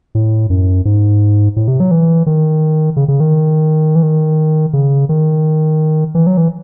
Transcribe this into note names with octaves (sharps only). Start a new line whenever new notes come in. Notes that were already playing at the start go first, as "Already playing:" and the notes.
A2
F#2
G#2
A2
C3
F#3
E3
D#3
C#3
C#3
D#3
E3
D#3
C#3
D#3
E3
F#3
E3